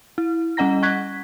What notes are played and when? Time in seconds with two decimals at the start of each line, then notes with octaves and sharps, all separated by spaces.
0.18 E4
0.57 G3 C#4 D#5 F#5 A#5 A#6
0.82 F#5 C#6 F#6 G#6 B6